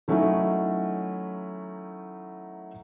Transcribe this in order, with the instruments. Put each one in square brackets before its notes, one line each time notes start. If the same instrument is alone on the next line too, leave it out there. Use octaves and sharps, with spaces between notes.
[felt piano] D#3 F#3 A3 C#4 D#4 E4